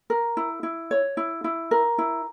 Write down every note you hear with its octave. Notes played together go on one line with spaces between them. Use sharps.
A#4
E4
E4
C#5
E4
E4
A#4
E4